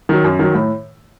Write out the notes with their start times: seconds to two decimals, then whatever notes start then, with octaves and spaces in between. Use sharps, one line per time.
0.09 D#3 F#3
0.24 F#2
0.39 D#3 F#3
0.54 A2